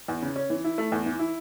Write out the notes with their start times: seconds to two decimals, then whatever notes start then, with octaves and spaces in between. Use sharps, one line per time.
0.08 E2
0.22 C#3
0.36 C#4
0.50 E3
0.64 E4
0.78 A3
0.92 E2
1.06 E3
1.19 E4